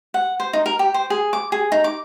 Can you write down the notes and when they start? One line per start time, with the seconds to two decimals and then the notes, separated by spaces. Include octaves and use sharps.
0.14 F#5
0.40 C5
0.53 D#4
0.66 A#4
0.79 G4
0.94 C5
1.10 G#4
1.33 D6
1.52 G#4
1.72 D#4
1.84 D6